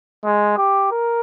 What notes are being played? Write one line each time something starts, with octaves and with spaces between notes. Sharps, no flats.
G#3
G4
A#4